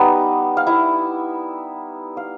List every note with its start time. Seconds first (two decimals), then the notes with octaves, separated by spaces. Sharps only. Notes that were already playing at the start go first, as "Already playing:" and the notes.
Already playing: G3 B3 D#4
0.57 F5
0.67 E4 E5
2.17 F5